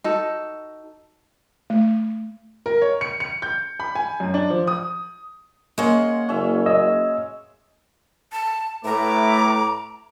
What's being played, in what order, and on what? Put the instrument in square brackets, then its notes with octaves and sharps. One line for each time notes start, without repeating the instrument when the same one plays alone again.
[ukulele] D#4 F#4 A4
[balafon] A3
[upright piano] A#4
C#5
C#7
C#7
G6
B5
G#5
F#2
D4
F3
D#6
[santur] G#3 C#4 C6 [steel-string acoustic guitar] A#3 F#5
[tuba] F#1 [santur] C#4 E5
[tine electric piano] D#5 E6
[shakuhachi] A5
[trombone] A2 [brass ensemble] A3 B4 E5 [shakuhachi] A#5 [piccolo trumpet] D6